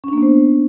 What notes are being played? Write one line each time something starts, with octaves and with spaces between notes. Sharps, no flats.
A#3 B3 C#4 D4 C5